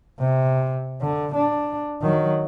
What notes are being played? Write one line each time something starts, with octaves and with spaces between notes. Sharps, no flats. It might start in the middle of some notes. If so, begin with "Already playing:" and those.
C3
D3
D4
D#3 F#3